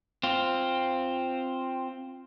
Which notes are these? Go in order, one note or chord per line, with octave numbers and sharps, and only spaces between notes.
C4 F4